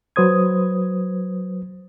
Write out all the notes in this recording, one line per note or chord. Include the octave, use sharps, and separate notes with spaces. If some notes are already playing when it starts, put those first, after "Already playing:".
F#3 B4 C5 D#6 G#6